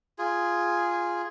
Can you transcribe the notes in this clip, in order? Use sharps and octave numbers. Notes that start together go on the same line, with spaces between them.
F4 G#4